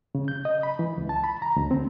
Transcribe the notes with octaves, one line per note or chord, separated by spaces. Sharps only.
C#3
G6
D#5
B5
E3
C#2
A5
B5
A#5
D2
C4